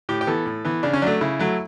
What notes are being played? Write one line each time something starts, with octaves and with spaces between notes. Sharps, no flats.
A2 G4
G4
E3 B3 A4
A2
E3 B3
C#3 D4
C#4
F#3 A3 D4
C#3 E4
F#3 A3